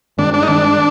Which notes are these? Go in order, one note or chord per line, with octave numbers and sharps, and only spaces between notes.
G2 D#3 G#3 C4 D4
D4
D#4
G2 D#3 G#3 C4 D4